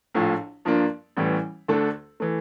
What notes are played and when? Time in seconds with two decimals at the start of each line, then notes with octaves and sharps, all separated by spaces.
0.14 A#1 A2 F3
0.65 G2 F3 A#3 D4
1.17 A1 A2 E3 G3
1.68 D2 D3 A3 D4 A4
2.20 E3 A3